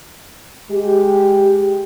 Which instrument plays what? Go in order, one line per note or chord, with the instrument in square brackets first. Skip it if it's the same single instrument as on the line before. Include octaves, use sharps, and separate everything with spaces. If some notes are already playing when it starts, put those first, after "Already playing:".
[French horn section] G#3 G4